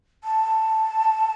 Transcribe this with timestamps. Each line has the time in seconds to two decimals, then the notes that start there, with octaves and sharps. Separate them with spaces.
0.24 A5